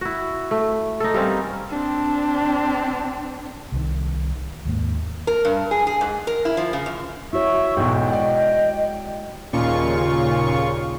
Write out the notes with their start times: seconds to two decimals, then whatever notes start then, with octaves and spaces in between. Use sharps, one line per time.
0.01 E4 F#4
0.51 A3
1.00 D#4 A4
1.14 G3 A#3 C4 C#4
1.69 C4 D4
3.72 C2 D#3
4.65 D#2 G#2 A#3
5.27 A#4
5.45 G2
5.71 G#4
5.87 G#4
6.01 G#2
6.27 A#4
6.45 E4
6.57 F3
6.73 C#3
6.86 F#2
7.33 E4 F#4 C#5 E5 C#6
7.77 B1 E2 G#2 G#3 E4 G5
8.12 D5 D#5 F#5
9.53 D#2 A#2 C#3 F4 C#6